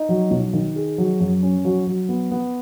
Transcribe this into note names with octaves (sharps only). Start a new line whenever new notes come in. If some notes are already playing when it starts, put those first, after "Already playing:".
Already playing: D#4
F#3
B1
D#3
G#4
F#3
F#2
C#4
F#3
F#3
B3
B3